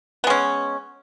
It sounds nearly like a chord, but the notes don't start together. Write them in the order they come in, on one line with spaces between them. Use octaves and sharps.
B3 G#3 C#4